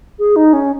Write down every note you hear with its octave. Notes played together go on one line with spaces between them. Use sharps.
G#4
D#4
C#4